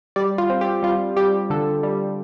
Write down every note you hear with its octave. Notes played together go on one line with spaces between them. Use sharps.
G3 D5
F4
C4
G4
G3 F4
G3 G4
D3 A4
G3